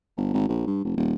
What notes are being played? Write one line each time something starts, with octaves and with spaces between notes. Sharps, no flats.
G1
G#1
A#1
G2
F1
D#1